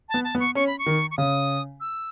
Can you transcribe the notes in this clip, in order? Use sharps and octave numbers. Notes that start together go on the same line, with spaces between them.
A5
B3
A5
B3
C#6
C#4 C#6
B5
C#6
D#3
C#6
C#3 D#6
E6